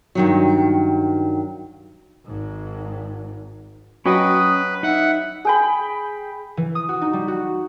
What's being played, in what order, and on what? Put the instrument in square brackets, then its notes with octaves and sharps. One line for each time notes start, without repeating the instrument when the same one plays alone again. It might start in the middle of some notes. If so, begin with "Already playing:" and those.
[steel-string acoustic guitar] G2 D#3 F#3
[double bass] G#1 G#2
[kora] F#3 D#5 [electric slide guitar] C#4 G5 [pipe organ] B4 [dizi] D#6
[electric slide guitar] D#4 [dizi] E5 [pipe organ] F#5
[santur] G#4 G5 B5
[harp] E3
D#6
F#4
D#4
G3
F#4